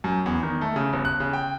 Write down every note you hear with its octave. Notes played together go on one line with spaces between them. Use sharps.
F#2
E2
D#3
A3
C#3
G1
F#6
C#3
G5